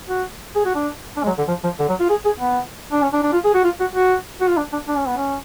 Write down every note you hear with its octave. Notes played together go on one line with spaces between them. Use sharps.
F#4
G#4
F#4
D4
D4
G#3
F#3
D3
F3
F3
D3
F#3
F4
G#4
G#4
B3
D4
C#4
D4
D4
F4
G#4
F#4
F4
F#4
F#4
F#4
F4
D4
D4
D4
C#4
B3
C#4